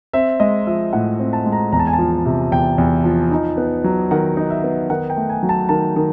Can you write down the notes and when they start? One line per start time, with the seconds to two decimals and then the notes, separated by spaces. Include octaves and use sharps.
0.13 C4 E5
0.40 G#3 D#5
0.67 F3 E5
0.93 A2 F#5
1.20 C4
1.33 A5
1.46 G#3
1.52 A#5
1.72 E2 A#5
1.79 A5
1.87 G#5
1.93 A5
1.99 F3
2.25 C3
2.52 E2 G5
2.78 E2
3.04 F3
3.31 D#4
3.57 B3
3.84 F#3
4.11 D#3 F#5
4.37 D#4
4.50 E5
4.64 B3
4.90 D#3 F#5
5.10 G5
5.16 A3
5.30 G#5
5.43 F#3
5.49 A5
5.69 D#3 A5
5.96 D#3